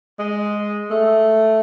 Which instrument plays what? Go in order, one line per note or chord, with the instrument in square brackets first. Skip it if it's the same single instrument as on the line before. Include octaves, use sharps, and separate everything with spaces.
[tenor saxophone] G#3
A3